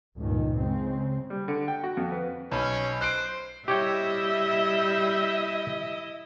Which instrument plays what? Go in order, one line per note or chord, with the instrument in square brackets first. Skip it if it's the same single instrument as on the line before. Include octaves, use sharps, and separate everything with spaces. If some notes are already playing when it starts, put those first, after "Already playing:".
[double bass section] C#2 G2 A#2 D#3
C#3 G#3 C4
[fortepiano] G3
D3
G5
F#4
F2
B4
[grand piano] B1 B5 [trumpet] C#4
[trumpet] C5 [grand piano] F#6 C7 D7
[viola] G3 [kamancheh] E4 D#5 [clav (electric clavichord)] G4 C#5 G5 [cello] E5